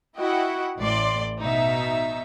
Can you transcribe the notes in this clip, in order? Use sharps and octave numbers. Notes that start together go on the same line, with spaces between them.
E4 F#4 D#5 F#5 G5
A1 A2 D5 C6
B2 D#4 E5